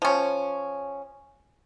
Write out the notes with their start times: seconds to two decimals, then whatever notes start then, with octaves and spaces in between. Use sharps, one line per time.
0.02 F3 C#4